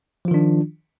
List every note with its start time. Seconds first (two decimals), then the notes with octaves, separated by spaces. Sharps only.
0.25 F3
0.28 F4
0.31 D#3
0.34 D4